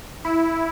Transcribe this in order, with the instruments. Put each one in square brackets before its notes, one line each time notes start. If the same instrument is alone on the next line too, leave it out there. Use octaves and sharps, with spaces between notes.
[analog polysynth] E4